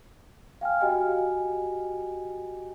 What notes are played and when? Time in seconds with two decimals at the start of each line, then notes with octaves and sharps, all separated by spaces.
0.61 F5 G5 G#5 F6
0.81 F#4 G4 D#5 G5 G#5